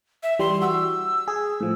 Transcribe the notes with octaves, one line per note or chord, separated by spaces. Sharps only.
E5
E3 G3 C6
F#4 E6
G#4
A2 F3